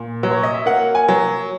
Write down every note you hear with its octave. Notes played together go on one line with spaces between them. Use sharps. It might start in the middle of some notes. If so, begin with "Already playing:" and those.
Already playing: A#2
F#3
C#5
D#5
E5
A#3 F#5
G#5
F#3